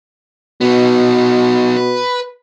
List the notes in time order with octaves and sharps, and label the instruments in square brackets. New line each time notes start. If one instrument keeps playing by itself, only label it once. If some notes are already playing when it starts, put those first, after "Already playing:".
[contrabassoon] B2 [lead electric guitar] B3 D#4
[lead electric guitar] B4